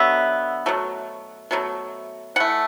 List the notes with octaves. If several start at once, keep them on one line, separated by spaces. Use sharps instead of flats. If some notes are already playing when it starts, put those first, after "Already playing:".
Already playing: D3 F#3 B3 E5
B2 F#3 A3
B2 F#3 A3
E3 A3 F#5